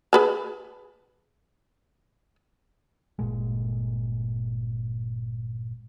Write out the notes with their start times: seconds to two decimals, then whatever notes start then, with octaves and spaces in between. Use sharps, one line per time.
0.13 G#4 B4 A5
3.19 G1 A#2 G#3